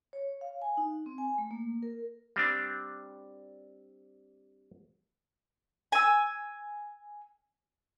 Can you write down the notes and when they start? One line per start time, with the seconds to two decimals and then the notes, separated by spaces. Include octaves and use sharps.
0.13 C#5
0.41 F5
0.62 G#5
0.77 D#4
1.06 C4
1.18 G#5
1.38 A3
1.51 A#3
1.83 A#4
2.36 G3 C4 D4
5.92 G#5 E6